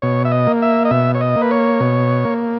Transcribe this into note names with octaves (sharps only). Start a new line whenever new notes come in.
B2 C#5
E5
D#5
A#3
E5
D#5
B2 E5
C#5
D#5
A#3
B4
C#5
B2
A#3